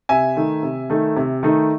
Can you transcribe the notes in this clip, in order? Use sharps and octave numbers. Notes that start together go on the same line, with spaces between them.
C3 E5 G#5
D#3 A3 D#4
C3
D#3 A3 D#4
C3
D#3 A3 D#4